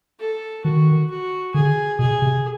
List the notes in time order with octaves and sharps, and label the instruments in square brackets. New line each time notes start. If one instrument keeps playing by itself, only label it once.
[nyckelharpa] A4
[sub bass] D#3 [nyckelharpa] F#4
[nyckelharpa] F#4
[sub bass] D3 [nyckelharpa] G#4
[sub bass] B2 [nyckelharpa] G#4
[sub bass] C3